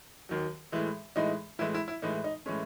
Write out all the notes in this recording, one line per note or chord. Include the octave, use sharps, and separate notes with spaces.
D#2 D#3 F#3
A2 E3 G#3
A2 E3 G#3 D#4
A2 E3 G#3 E4
E4
E4
A2 E3 G#3 D#4
D#4
A2 E3 G#3 C#4